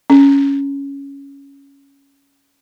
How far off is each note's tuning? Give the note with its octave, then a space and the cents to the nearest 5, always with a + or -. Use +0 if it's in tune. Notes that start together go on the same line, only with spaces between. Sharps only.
C#4 +5